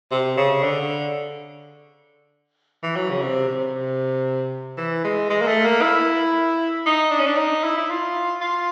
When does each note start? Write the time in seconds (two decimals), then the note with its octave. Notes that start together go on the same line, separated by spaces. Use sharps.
0.11 C3
0.37 C#3
0.63 D3
2.83 E3
2.96 F#3
3.10 C#3
3.22 C3
3.48 C3
4.77 E3
5.04 G#3
5.30 G#3
5.42 A#3
5.47 A3
5.65 A#3
5.82 E4
6.86 D#4
7.11 D4
7.19 C#4
7.26 D4
7.37 D#4
7.64 E4
7.78 E4
7.90 F4
8.41 F4